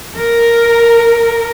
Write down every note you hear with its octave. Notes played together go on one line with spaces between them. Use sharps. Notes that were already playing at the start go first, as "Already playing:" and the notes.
A#4